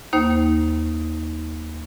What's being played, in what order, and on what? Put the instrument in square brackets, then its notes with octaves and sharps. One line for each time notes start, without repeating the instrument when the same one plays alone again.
[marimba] D#2 A#3 D#4 C5